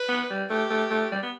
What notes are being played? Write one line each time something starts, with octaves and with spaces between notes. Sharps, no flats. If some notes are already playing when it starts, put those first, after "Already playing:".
Already playing: B4
B3
G3
A3 G4
A3
A3
G3
B3